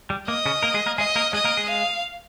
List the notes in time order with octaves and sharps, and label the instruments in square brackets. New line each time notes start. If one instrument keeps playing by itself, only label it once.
[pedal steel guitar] G3
[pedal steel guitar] A#3 [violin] D#5
[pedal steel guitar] C#3 C#4
A#3 A#4
G#3 G#4
A#3 A#4
[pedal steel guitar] G#3 G#4 [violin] D#5
[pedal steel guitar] A#3 A#4
[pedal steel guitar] G#3 G#4 [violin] D#5
[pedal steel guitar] A#3 A#4
G#3 G#4
[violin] F5